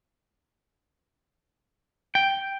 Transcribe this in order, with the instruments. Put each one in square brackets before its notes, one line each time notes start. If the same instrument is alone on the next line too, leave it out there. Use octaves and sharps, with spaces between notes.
[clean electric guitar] G5